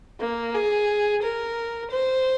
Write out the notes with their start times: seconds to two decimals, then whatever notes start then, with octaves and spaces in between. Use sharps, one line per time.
0.20 A#3
0.54 G#4
1.22 A#4
1.90 C5